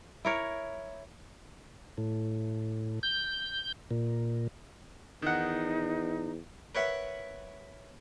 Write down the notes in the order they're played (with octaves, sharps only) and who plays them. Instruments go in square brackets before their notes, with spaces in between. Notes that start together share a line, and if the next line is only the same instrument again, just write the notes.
[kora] E4 A#4 C#5
[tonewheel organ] A2
G6
A#2
[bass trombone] E2 [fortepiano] D#3 F#5 [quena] D#4
[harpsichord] A#4 B4 C#5 E5 F#5